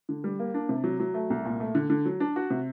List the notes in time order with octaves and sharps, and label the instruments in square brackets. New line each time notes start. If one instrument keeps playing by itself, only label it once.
[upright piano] D3
G3
A#3
D4
C3
F#3
F#3
A3
C2
A#2
A3
D3
D3
F#3
D4
F#4
C3